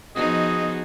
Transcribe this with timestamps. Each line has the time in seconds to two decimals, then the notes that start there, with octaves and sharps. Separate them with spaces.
0.16 F3 B3 D#4 F#4 G#4 D#5